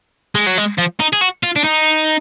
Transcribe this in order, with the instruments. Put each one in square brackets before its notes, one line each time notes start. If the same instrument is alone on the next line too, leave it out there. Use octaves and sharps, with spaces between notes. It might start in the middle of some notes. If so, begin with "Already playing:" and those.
[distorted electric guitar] G#3
F#3
G#3
F3
D#4
G#4
F#4
F4
D4
D#4